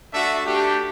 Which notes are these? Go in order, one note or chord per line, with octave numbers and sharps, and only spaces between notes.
A3 D4 F#4 E5
A3 D4 G4